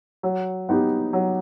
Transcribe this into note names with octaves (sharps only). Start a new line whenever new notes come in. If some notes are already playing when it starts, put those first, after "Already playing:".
F#3
B3 D#4 G4
F#3